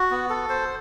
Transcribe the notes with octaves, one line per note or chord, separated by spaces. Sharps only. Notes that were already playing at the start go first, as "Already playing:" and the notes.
Already playing: F#4
B3
A4
C5